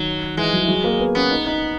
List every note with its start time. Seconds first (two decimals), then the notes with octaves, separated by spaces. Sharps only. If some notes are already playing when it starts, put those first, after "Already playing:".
Already playing: D#3 F#3
0.37 E3 G#3
0.53 F#3
0.64 E3
0.68 F#3
0.84 A#3
1.00 B3
1.15 B3 C#4
1.31 D#4
1.46 D#4